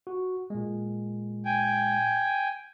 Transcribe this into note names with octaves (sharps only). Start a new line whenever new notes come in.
F#4
A#2 G#3
G5 G#5